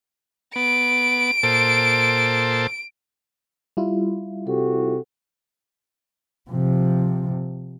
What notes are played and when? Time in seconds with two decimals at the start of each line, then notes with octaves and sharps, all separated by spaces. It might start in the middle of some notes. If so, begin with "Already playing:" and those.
0.56 B3 D7
1.43 A#2 A4 C5
3.77 G3 E4 F4
4.47 C3 F#4 G4 A4
6.50 C3 F3